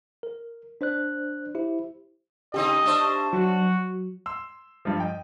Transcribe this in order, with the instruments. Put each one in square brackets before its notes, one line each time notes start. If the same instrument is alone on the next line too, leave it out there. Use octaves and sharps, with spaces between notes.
[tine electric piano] A#4
D4 C5 D5 F#6
E4 G4 C5 E5
[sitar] C#3 C4 D#4 [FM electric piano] G4 [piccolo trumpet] D#5
[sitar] A3 D4 C5
[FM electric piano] F#3 [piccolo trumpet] F#4
[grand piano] C6 E6
G2 F3
D#5 G5